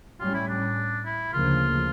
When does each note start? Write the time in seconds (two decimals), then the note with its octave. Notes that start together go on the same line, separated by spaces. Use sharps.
0.20 A2 G3 C#4 F4
0.34 E4
0.48 D4
1.05 E4
1.33 D2 C#3 F3 A#3 F4